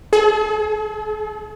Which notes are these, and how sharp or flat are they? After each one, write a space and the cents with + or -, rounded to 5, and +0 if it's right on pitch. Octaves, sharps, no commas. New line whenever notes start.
G#4 +45